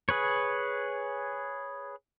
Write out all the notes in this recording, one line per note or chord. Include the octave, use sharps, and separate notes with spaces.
G#4 B4 C#5